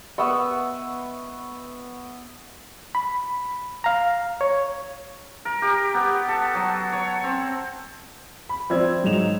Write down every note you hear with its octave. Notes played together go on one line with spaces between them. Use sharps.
B3 B4 E5 C#6
B5
F5 A#5
C#5
A#4
G4
B3
A4
F#3
C#5
C4
B5
F3 C4 D5 E5 E6 G#6
G#2 F#3 D#4 E7 F7